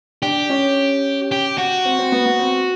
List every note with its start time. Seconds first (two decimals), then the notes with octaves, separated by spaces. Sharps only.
0.22 D4 G4
0.50 C#4
1.32 G4
1.58 F#4
1.85 C4
1.99 C4
2.12 B3
2.26 B3
2.39 C4